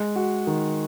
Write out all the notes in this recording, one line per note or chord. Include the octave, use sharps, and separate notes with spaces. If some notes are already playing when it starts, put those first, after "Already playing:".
Already playing: G#3
F#4
D#3